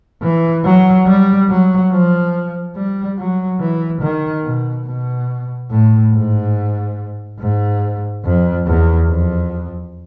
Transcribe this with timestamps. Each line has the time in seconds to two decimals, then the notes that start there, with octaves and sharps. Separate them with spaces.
0.23 E3
0.65 F#3
1.07 G3
1.50 F#3
1.92 F3
2.76 G3
3.18 F#3
3.61 E3
4.02 D#3
4.44 B2
4.87 B2
5.71 A2
6.14 G#2
7.40 G#2
8.25 F2
8.67 E2
9.09 F2